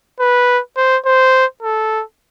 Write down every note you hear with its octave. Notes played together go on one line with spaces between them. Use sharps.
B4
C5
C5
A4